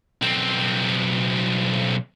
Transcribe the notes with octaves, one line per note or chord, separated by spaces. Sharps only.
B1 C4